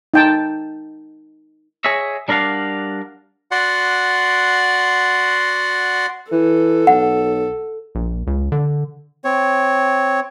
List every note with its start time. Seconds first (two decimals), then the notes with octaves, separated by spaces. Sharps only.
0.14 D#4 G5 A5
1.85 G#4 C#5 D#5 E5
2.28 G3 D4 A#4 D5 F5 F#5
3.51 F#4 D5 F#5 C6
6.32 E3 A4
6.87 B1 F#5
7.95 A#1
8.27 C#2
8.52 D3
9.25 C4 C#5